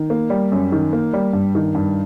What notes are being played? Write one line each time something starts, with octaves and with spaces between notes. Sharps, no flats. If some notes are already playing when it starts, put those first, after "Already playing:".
Already playing: D#3
A#3
G3
F#2
D#3
A#3
G3
G2
D#3
G2